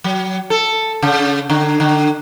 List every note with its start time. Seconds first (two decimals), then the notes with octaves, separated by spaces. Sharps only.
0.04 F#3
0.50 A4
1.02 C#3
1.50 D3
1.80 D3